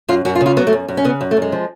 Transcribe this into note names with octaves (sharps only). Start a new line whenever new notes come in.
F#2 F4
F#2 F#4
F4
C#3
F4
F#3 B3
A3
F#2
F#2
C#4
C#3 B3
F#2
A3
F#2
G#3
F3